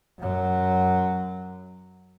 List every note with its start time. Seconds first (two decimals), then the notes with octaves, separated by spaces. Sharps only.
0.19 F#2 F#3